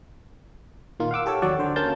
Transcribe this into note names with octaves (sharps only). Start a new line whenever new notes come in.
A#2 D#3 A#3 F4
F5 F#5 D6 E6
G4 A4 C#5
D#2 F#3 D5 F#5 C#6
D3 C5
A#3 C#4 F5 A5 G6 A6